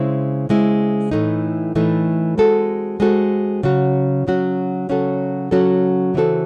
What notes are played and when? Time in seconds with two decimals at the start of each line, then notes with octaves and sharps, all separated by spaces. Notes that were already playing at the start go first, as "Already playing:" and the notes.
Already playing: C#3 G#3 C4 E4
0.49 C#3 G#3 C4 E4
1.11 A2 E3 A3 D#4
1.75 A2 E3 A3 D#4
2.37 G#3 C4 F#4 A4
3.00 G#3 C4 F#4 A4
3.63 C#3 F#3 C#4 F#4
4.27 C#3 F#3 C#4 F#4
4.89 C#3 F#3 C#4 F#4 A4
5.51 C#3 F#3 C#4 F#4 A4
6.14 C#3 E3 C4 F#4 A4